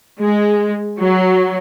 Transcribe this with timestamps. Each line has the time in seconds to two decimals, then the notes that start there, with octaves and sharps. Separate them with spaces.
0.22 G#3
0.99 F#3